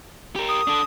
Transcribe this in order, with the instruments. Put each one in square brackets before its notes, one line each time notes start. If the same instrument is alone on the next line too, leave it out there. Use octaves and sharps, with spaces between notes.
[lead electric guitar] G4 A#4
[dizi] D#6
[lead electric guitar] D4 A4